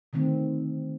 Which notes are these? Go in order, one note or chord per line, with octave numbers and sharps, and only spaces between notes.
D3 D#3 A3 C4